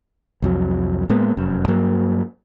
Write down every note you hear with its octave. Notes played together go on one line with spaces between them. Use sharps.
C2 F2 F#3
A2 G#3 A#3 B3
F1 F#2
G2 F#3 A#3